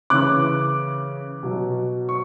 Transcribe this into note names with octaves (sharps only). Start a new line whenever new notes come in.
C#3 E3 D6 F#6
B2 F#3
C#6